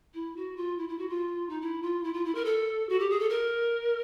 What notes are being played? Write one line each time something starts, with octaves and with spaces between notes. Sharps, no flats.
E4
F#4
F4
E4
E4
F#4
F4
D#4
E4
F4
E4
F4
E4
A#4
A4
F#4
G4
G#4
A4
A#4